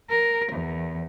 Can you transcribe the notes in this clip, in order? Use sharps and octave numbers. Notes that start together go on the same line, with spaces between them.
A#4
E2